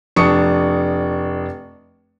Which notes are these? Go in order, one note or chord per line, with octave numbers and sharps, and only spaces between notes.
F1 D4 C#6 D#6 C#7